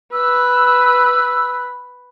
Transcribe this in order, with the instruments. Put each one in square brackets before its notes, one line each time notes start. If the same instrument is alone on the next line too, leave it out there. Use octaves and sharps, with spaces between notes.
[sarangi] B4 [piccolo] E6